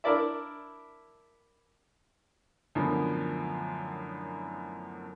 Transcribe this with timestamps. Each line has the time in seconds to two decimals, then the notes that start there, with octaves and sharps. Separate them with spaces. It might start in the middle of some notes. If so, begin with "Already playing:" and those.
0.04 D4 E4 A#4 D5 E5
2.75 F#2 A2 D3 F3 A#3 B3